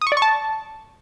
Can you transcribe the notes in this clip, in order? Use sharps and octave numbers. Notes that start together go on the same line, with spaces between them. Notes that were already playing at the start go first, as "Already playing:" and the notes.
D#6
C#6
D5
C#6
A5